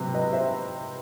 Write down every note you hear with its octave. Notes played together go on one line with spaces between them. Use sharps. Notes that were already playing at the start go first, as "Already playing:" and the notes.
Already playing: C3 F#3 C4 B4
B4 D#5
C5 E5